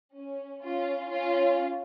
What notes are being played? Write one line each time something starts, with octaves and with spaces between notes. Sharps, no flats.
C#4
C#4 F4
C#4 F4